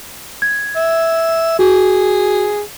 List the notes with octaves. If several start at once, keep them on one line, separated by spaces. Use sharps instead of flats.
G#6
E5
F#4 G#4